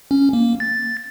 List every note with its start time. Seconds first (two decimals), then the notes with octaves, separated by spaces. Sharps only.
0.11 C#4
0.33 A#3
0.60 A6